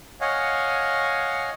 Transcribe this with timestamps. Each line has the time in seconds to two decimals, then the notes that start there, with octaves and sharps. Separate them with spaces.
0.21 C#5 D#5 F5 F#5 G#5